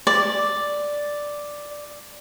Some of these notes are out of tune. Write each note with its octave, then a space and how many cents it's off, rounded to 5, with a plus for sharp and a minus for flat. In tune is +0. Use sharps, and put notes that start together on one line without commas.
D5 +0